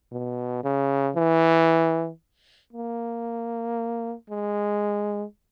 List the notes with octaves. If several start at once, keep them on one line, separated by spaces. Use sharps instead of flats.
B2
C#3
E3
A#3
G#3